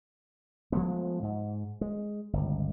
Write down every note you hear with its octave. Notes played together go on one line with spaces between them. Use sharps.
F3 G#3 A3 B3
G#2
G#3
G1 C#2